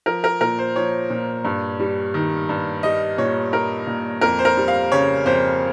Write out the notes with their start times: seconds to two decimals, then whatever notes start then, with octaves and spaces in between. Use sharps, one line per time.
0.06 F3 A#4
0.24 A#4
0.41 A#2 A#4
0.59 C5
0.76 F3 C#5
1.10 A#2
1.45 G2
1.80 G3
2.14 D#3
2.49 G2
2.83 G3 D#5
3.18 A#2 C#5
3.53 G3 A#4
3.87 A#2
4.21 F2 A#4
4.39 C5
4.45 A#4
4.57 G3
4.68 F5
4.92 C#3 C#5
5.26 F2 C5